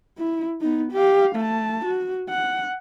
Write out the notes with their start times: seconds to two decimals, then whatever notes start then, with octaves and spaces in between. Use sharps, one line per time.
0.19 E4
0.61 B3 D#4
0.92 G4 F5
1.36 A3 A5
1.85 F#4
2.29 F#5